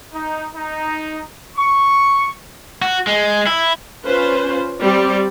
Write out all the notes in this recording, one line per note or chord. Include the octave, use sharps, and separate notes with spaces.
D#4
D#4
C#6
F#4
G#3
E4
C#4 F4 B4 C5
G3 C4 D5